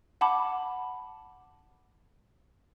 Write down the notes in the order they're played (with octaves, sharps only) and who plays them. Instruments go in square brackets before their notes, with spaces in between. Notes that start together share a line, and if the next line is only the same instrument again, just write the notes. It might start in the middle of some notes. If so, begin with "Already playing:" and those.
[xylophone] F#5 A5 B5 D6